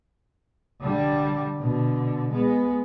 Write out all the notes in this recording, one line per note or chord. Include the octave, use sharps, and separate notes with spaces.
D3 G3
B2 D3
G#3 B3